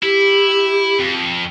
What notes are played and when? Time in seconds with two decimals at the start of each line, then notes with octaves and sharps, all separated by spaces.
0.03 E4 G4
1.00 F2